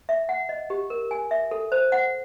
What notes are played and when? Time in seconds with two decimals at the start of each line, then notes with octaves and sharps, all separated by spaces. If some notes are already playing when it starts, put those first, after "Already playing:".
0.09 E5
0.29 F#5
0.49 D#5
0.70 G4
0.90 A#4
1.11 G#5
1.31 E5
1.51 A4
1.72 C5
1.92 F#5